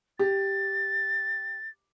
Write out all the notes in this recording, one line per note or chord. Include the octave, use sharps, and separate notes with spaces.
G4 A6